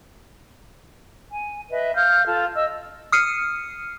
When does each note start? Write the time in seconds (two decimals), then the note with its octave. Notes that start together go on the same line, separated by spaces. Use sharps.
1.31 G#5
1.70 B4 D#5 E5
1.95 F5 F6 G6
2.26 F4 A4
2.55 D#5 E6
3.12 D#6 F6 C7 C#7 D#7